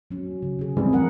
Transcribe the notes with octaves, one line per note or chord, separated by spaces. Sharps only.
F#3 C#4
C#3
C#3 G#4
E3 G3 C4 G#4
F3 A#4 F#5